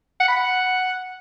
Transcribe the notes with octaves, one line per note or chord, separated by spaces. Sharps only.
F#5
B5
F#5